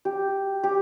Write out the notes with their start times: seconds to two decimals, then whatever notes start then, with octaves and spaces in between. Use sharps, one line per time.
0.05 G4
0.63 G4